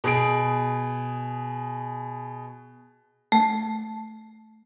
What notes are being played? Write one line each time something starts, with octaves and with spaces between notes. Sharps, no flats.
B2 G#4 D7
A3